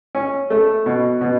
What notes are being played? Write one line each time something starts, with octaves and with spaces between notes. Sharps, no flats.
C#4
A3
B2
B2